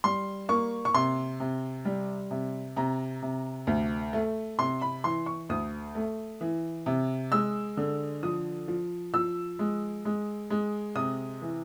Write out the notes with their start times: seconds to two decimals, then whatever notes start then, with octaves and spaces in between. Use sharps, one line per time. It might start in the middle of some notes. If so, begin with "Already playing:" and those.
0.04 G3 C6
0.49 A#3 C#6
0.85 C#6
0.94 C3 C6
1.40 C3
1.85 G3
2.31 C3
2.77 C3 A#5
3.22 C3
3.67 D2
4.13 A3
4.59 C3 C6
4.82 B5
5.04 E3 C6
5.26 C#6
5.49 D2 D#6
5.95 A3
6.41 E3
6.86 C3
7.32 G#3 E6
7.77 D3
8.23 F3 D#6
8.68 F3
9.14 F3 E6
9.59 G#3
10.05 G#3
10.50 G#3
10.95 C3 D#6
11.42 E3